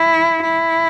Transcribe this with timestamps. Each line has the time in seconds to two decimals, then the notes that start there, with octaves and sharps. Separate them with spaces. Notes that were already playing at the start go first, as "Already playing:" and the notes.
Already playing: E4
0.44 E4